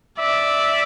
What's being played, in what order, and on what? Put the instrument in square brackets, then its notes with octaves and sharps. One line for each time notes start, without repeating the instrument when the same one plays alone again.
[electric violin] D5 [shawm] E5